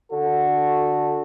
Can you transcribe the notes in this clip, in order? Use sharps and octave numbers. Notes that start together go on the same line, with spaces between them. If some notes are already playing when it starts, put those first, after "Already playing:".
D3 F#4 A4